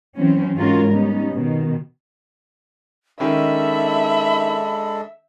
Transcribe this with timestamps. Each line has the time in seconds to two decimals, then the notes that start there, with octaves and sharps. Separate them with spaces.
0.17 E3 F#3 C4 C#4
0.56 G#2 G#3 C#4 F4 F#4 A#4
0.91 G3 B3 C#4 D#4
1.32 B2 D#3
3.20 D#3 G#3 C#4 D4 A4 E5 B5